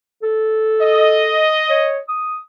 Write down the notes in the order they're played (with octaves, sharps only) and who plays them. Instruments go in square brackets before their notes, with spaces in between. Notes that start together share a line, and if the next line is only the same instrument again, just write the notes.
[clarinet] A4
[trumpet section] D#5
[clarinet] C#5
D#6